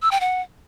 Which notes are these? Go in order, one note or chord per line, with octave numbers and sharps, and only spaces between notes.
E6
G5
F#5